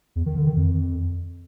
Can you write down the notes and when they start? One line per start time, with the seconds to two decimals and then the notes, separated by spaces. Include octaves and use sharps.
0.16 E2
0.26 D#3
0.36 D3
0.46 D#3
0.57 F2